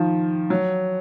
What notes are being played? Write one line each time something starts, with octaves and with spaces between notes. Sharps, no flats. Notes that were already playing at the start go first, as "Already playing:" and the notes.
Already playing: D#3 F3
F#3